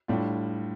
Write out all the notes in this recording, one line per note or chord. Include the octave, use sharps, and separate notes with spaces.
A2 G3 D4 F4